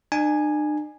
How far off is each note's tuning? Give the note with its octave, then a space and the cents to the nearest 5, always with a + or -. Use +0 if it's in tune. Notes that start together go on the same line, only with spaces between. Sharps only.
D4 +45 G#5 +0